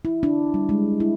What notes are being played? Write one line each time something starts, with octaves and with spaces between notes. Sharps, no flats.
E4
D4
G3
G#3
E4